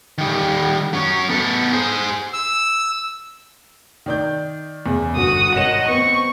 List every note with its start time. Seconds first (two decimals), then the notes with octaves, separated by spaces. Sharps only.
0.18 D#3 G3
0.93 F#3 C#4
1.29 B3 A4
1.73 G#4 C5
2.33 E6
4.06 D#3 D5 G6
4.86 E2 C#3
5.16 G1 F#4 D#6
5.55 G#1 C#5 D#5 F#5 E7
5.88 B3 C4 C#6